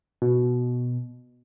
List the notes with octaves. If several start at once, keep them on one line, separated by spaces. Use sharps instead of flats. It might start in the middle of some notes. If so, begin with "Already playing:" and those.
B2